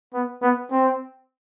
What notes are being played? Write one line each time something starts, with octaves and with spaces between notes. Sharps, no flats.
B3
B3
C4